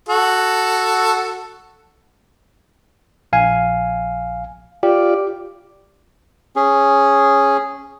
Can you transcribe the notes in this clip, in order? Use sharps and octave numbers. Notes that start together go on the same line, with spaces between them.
F#4 A4
A#1 F5 G#5
F4 G4 D5
C#4 G#4